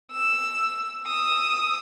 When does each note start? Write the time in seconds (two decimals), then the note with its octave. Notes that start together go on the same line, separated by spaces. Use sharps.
0.12 E6
1.04 D#6 E6